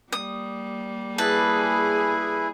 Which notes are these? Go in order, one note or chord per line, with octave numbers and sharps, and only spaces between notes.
G3 A#3 D#6
E4 G#4 B4 A5